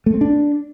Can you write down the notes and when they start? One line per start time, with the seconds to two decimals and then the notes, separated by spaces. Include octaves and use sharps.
0.06 A3
0.14 C4
0.21 D4